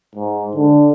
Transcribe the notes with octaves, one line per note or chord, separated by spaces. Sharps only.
G#2
D3